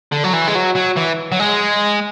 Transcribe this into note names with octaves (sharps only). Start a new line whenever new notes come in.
D3
F#3
E3
G#3
F#3
F#3
E3
F#3
G#3